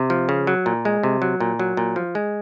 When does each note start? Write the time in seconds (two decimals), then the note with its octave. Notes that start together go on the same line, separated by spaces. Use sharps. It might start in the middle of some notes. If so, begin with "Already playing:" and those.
Already playing: C3
0.10 F3
0.29 C#3
0.47 F#3
0.66 A#2
0.85 G#3
1.03 C3
1.22 F#3
1.40 A#2
1.60 F#3
1.77 A#2
1.96 F3
2.15 G#3